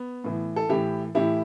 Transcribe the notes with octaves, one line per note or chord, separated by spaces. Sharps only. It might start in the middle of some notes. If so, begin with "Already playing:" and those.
Already playing: B3
A2 E3
A4
A2 E3 E4 G4
A2 E3 E4 G4